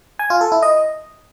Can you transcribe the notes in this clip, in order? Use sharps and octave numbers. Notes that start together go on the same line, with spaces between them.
G#5
F4
A4
E4
D#5